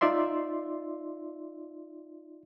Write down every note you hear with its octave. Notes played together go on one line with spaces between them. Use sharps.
D#4 F4 D5 E5 C6